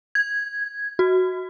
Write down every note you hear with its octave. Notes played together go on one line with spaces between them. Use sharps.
G#6
F#4